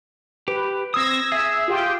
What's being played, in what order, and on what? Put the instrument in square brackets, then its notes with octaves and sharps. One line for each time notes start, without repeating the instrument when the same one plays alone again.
[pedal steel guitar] G4 [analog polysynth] B4
[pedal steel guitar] C4 D#6 [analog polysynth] E6 G#6 A#6
[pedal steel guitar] G#4 [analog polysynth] E5 E6
[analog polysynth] F4 G4 G5